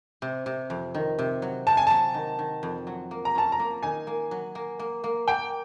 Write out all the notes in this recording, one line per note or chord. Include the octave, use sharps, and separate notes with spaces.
C3
C3
F2
D#3
C3
F#3
C3 A5
G#5
F#3 A5
D#3
D#3
F2
F#3
A#3
A#5
C#4 A5
A#5
A#3
D#3 G#5
A#3
F#3
A#3
A#3
A#3
A#3 G5